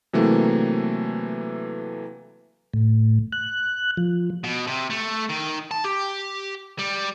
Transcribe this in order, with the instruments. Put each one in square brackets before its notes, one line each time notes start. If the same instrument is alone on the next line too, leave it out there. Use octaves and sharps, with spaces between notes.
[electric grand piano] C3 E3 F#3 A3 A#3
[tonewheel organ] A2
F#6
F3
[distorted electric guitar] B2
C3
A3
D#3
A5
G4
G3